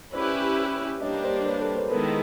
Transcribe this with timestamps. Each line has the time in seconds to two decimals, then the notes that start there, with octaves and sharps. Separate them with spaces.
0.13 C#4 E4 G4 B4 C5 D5
1.01 G3 A#3 D4 G4 C#5 D#5
1.24 C5 D5
1.46 B4 C#5
1.61 A4 B4
1.76 A#4 C5
1.90 D#3 G#3 B3 E4 A4 B4